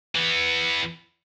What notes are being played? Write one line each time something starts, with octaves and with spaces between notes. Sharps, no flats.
E3 B3